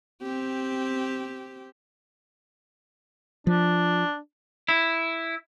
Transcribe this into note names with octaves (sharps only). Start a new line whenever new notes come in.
C4 G4
F3 D4
E4